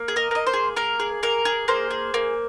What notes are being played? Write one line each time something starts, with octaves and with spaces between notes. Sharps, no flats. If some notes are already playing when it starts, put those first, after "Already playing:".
Already playing: A#3
G#4
A#4 D#5
A#3 D#5
C5
G#4
A#3 A#4
G#4
A#3 A#4
G#4
A#3 C5
G#4
A#3